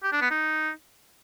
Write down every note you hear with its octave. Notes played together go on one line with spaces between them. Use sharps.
G4
D4
B3
D#4